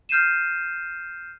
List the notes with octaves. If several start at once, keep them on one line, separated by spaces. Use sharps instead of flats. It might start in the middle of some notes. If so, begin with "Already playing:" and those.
F6 G6 C7 D#7 E7